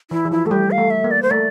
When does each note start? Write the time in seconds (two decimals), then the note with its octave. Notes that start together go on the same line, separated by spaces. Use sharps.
0.11 E3 E4
0.25 E3
0.31 F3 E4
0.46 A3 A4
0.51 G3 G4
0.71 F5
0.78 A3
0.90 E5
1.04 A#3
1.11 D5
1.22 C5
1.31 A3 D5